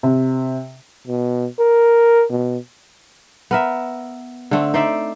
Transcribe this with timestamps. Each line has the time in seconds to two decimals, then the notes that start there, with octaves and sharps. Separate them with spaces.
0.03 C3
1.07 B2
1.59 A#4
2.30 B2
3.51 B3 A#4 E5
4.51 D3 A3 C4
4.74 D#4 C5 D5 E5